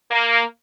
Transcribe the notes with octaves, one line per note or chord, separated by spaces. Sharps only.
A#3